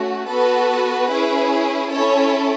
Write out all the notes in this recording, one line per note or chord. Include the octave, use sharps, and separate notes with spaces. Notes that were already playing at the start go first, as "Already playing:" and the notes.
Already playing: A3 C#4 F#4
B3 F#4 A4 B4
C#4 E4 G#4
C#4 E4 A4 C#5